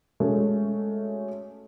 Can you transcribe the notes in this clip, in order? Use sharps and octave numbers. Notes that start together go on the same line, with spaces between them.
G#3 A3 C#4 F#4